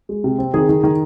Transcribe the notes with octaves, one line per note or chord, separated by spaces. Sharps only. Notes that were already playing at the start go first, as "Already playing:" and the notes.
G#3
C3
C4
D#3 G#4
D#3
D#3